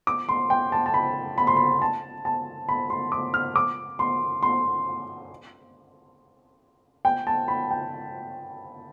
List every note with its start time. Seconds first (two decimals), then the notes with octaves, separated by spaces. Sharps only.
0.07 D6
0.29 C6
0.50 G5
0.72 A5
0.86 A5
0.94 B5
1.38 B5
1.47 C6
1.57 B5
1.82 A5
2.25 A5
2.69 B5
2.90 C6
3.12 D6
3.34 F6
3.56 D6
3.99 C6
4.43 C6
7.05 G5
7.27 A5
7.48 B5
7.71 G5